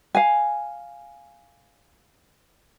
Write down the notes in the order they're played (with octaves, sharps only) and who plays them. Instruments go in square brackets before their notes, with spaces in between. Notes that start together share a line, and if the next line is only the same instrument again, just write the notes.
[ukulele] F5 G#5